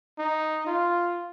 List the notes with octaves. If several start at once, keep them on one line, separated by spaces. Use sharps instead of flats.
D#4
F4